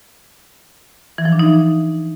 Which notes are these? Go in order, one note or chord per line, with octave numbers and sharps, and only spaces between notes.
E3
F3
D4
D#4
E3